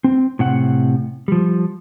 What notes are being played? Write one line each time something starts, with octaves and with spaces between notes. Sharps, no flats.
C4
A2 C3 F#5
F3 G3